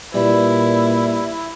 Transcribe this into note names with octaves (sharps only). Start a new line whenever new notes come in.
A#2 G3 E4 B4